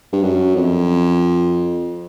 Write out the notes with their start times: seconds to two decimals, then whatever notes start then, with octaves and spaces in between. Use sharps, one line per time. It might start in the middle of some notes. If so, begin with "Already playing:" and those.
0.13 G2
0.22 F#2
0.56 F2